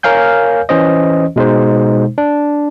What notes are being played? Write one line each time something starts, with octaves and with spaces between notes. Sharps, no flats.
A#4 C#5 F5 G#5 G6
E3 C#4 C5 D#5
B2 G#3 D#4 C5
D4